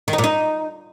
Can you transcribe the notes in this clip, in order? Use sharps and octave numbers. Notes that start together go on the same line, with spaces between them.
D#3
D#4
A#2
D#4